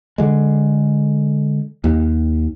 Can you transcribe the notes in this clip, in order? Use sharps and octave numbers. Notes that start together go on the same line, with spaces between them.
D3 G#3
D#2